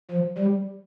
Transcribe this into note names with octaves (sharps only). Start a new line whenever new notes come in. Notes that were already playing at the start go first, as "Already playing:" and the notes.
F3
G3